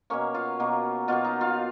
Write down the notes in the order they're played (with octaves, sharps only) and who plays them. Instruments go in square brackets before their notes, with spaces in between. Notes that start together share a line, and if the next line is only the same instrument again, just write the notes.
[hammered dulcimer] B2 F#3 A#3 C#4 C#5
F4 F5
B2 F#3 A#3
B2 F#3 A#3 F4 F5
D#4 D#5
F4 F5